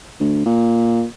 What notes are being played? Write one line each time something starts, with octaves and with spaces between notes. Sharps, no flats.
D2
A#2